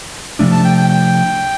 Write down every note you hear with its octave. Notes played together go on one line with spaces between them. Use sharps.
C3 F3 A3 D4
A5
G5
G5
G5